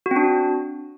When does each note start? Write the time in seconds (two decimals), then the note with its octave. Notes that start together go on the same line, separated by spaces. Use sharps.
0.06 F#4
0.11 C4
0.16 D4